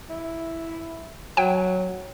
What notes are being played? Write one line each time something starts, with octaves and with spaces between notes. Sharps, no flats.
E4
F#3 G5